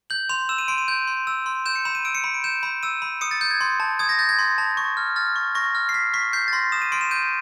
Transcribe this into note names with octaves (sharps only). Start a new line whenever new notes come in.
G6 F#7
C6 F7
E6 E7
D#7
C6 D7
D#7
G6
C6
E6
C6
G6 E7
C#7
B5 E7
D#7
E6 D7
C#7
B5
D7
G6 E7
B5
E6 D#7
B5
D#6 C#7
A6
G6
G#6
C6
A5
D#6 G#6
A#6
G6 A6
G#6
C6
A5
C#6
F6
F6 A6
C#6
C#6 A#6
F6
C7
F6 B6
C#6 B6
G6 C7
A6
C6 A#6
D#6 E7
D#7
C6 D7
E7
G6 D#7